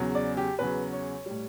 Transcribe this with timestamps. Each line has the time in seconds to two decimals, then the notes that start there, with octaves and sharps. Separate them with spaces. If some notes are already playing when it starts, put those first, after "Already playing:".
Already playing: E2 C#3 F#3
0.15 D5
0.37 G4
0.59 E2 C#3 F#3 B4
0.92 C#5
1.26 A2 G3